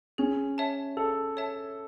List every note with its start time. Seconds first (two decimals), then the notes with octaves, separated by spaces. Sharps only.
0.18 C#4 G#4
0.58 C#5 E5 A5
0.97 G#4 A4
1.37 C#5 E5 A5